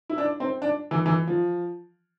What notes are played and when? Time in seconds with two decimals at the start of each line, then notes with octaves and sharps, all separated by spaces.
0.10 E4
0.18 D4
0.40 C4
0.62 D4
0.91 E3
1.06 E3
1.27 F3